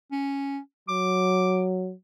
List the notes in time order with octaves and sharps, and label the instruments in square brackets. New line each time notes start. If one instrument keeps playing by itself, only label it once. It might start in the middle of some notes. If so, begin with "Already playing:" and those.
[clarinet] C#4
[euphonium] F#3 [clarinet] D6